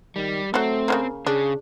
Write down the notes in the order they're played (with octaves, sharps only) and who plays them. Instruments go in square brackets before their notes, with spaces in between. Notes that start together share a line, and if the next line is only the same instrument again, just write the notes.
[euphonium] D#3 [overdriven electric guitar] G3
[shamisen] F#3 A4 [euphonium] A3 [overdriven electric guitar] C4
[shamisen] C#3 F#3 A#3
[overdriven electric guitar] C#3 [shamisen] D4 [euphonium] G#4